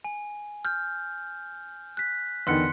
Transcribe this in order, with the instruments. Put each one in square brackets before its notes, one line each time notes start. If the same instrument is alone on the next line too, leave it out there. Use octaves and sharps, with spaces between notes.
[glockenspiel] G#5
F6 G6
F#6 B6
[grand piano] E2 D3 D#3 [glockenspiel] C6 F#6 C#7